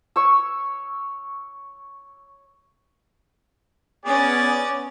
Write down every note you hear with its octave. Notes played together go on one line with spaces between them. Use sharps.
C#5 C#6 E6
B3 C#4 G#4 D5